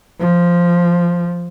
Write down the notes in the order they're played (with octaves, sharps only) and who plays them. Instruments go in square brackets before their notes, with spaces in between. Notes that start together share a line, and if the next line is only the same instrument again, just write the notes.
[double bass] F3